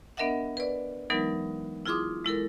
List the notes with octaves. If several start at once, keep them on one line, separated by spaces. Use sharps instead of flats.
B3 D4 A#4 D#5 E5 F#5
B4 D5
E3 F#3 G#3 B3 D#4 A#4
E4 F4 G#4 C6 D6 D#6
G#3 E4 A4 A#4